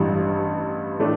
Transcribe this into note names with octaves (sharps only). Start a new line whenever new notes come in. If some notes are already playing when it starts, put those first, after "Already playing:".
Already playing: A1 G2 E3 G3
A2 E3 A3 D4